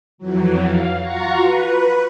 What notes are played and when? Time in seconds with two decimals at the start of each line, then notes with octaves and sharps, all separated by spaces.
0.18 F2 E3 F#3
0.67 F5
1.00 F4 F#4 A#5 C#6
1.40 B4